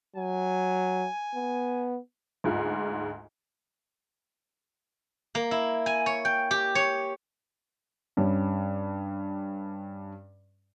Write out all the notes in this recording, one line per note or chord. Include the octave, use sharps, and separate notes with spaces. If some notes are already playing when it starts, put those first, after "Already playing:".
F#3 G#5
B3
D2 G#2 F4
A#3
E4
G#5
C#5
G5
G4
C#5
G2 G3 C#4